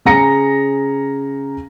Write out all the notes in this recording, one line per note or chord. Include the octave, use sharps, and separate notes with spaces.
C#3 G#4 A#5 A#6 C#7